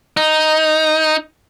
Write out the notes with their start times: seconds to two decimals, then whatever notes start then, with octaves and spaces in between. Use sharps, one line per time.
0.17 D#4